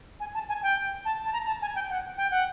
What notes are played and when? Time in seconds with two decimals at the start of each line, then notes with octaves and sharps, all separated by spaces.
0.20 G#5
0.34 A5
0.48 G#5
0.62 G5
1.05 A5
1.25 A5
1.33 A#5
1.47 A5
1.61 G#5
1.75 G5
1.90 F#5
2.17 G5
2.31 F#5